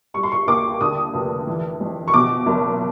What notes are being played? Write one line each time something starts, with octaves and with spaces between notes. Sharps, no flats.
G3 C#6
C6
C#6
D#2 D6
D3 D#6
F1
E3
F2
C#6
B2 D6
F#1